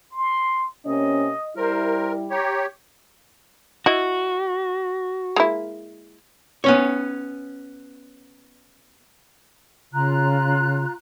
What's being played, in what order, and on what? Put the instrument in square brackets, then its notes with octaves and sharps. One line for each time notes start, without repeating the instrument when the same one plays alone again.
[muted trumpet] C6
[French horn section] C3 A#3 C#4 [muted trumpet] D#5
[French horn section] G3 E4 [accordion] A#4 [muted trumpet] C5
[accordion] G4 C#5 [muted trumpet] A#5
[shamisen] E4 D#5 [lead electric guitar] F#4
[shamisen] G#3 A#3 E4
[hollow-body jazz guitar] B3 C#4 C#5
[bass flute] C#3 [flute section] F4 A#5 F#6